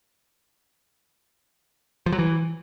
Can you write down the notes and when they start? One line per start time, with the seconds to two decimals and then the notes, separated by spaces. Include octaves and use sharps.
2.06 F3
2.12 F#3
2.19 E3